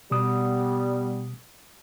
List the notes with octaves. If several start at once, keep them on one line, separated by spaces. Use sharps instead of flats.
B2 G3 B3 D#6